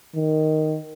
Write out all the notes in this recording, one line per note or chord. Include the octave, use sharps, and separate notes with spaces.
D#3